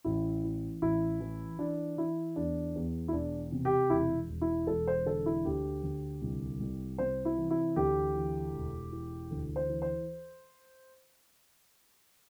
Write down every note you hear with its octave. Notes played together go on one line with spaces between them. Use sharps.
A1 E4
E3
A1 E4
E3
E3 D4
E3 E4
E2 D4
E2
E4
E1 D4
C3
G4
E1 E4
E1
E4
E1 A4
C5
D3 A4
E4
D2 G4
D2
C2
C2
C3 C5
E4
E3
E4
D2 G4
E3
E1
E3
D2
C5
E3
C5